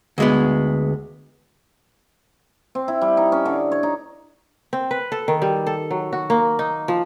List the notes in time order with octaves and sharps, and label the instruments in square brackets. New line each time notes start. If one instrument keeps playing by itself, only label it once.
[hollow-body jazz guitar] D2 G#3 B3
[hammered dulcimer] C4
E4
G3
D#4
C#4
D3
C#5
D#4
[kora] C4
B4
A4
D#3
G3
A4
F#3
F#4
A#3
D#4
F3